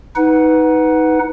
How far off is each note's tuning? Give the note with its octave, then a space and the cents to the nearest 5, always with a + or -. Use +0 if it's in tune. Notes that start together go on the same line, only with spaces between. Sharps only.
D#4 +20 B4 +5 F#5 +0